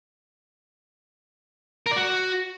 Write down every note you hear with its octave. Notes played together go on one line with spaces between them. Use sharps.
A#4
D5
F#4